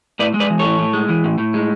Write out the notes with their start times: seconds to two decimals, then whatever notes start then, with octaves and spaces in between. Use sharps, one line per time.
0.19 A2 B4 D5
0.34 G#3
0.40 B4 D5
0.50 E3
0.59 A4 C#5
0.65 A2
0.79 A2
0.93 G#3
1.09 E3
1.24 A2
1.38 A2
1.54 G#3